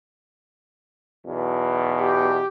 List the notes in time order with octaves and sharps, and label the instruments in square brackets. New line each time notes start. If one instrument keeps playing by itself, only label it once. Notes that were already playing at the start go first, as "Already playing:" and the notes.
[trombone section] B1 E2 B2
[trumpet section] G4